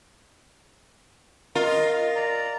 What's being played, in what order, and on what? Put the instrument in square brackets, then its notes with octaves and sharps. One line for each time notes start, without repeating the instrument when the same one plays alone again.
[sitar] F4 [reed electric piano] A#4 [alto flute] D#5
[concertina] D5 A#5